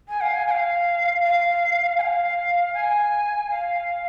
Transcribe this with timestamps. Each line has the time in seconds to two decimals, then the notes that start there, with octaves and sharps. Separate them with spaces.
0.09 G#5
0.21 F5
0.34 G#5
0.47 G#5
0.51 F5
1.22 F5
1.98 G#5
2.01 F5
2.74 G#5
3.50 F5